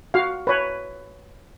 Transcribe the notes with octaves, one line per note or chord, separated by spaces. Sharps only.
F#4 F5
B4 C#5